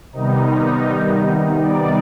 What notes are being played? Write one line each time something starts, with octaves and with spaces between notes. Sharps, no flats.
C3 D#3 G3 B3 D#4
D5